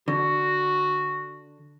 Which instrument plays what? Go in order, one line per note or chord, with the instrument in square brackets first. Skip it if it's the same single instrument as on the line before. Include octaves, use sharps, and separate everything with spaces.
[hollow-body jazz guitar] D3 [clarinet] F#4